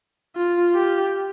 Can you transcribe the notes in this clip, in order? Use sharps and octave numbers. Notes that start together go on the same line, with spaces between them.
F4
G4